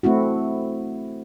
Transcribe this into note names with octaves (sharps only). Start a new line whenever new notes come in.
A3 C4 E4 F#4